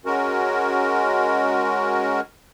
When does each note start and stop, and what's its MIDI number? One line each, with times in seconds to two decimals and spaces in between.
0.06 2.20 56
0.06 2.20 61
0.06 2.20 66
0.06 2.20 70